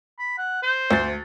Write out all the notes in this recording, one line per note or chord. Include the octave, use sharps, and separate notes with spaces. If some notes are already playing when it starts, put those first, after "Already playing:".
B5
F#5
C5
D2 A6